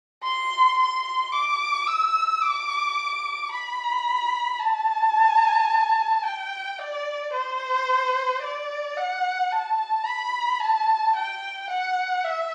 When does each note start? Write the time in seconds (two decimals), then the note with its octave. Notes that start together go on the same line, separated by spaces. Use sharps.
0.23 C6
0.78 C6
1.32 D6
1.87 E6
2.41 D6
3.51 B5
4.60 A5
6.24 G5
6.79 D5
7.33 C5
8.42 D5
8.97 F#5
9.52 A5
10.06 B5
10.60 A5
11.16 G5
11.70 F#5
12.24 E5